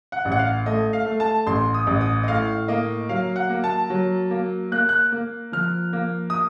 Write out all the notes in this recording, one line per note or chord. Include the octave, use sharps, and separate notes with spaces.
F#5
A1
F#5
F5
A3 D#5
F5
A3
A5
A1 C6
D#6
A1
D#6
D#5
A2 F5
A#3 D#5
F#3 F5
F#5
A#3
A5
F#3
A#3
A#3 F#6
F#6
A#3
F3 F6
A#3
D#6